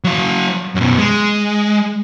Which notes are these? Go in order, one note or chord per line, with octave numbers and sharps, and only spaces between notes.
F#3 F5
F#2 B2
G#3